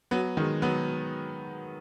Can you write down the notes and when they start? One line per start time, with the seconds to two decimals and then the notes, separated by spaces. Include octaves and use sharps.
0.11 F#3 B3
0.37 D#3 G#3
0.62 F#3 B3